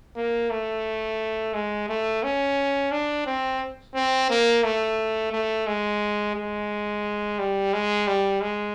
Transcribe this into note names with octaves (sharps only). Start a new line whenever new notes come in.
A#3
A3
G#3
A3
C#4
D4
C4
C4
A#3
A3
A3
G#3
G#3
G3
G#3
G3
G#3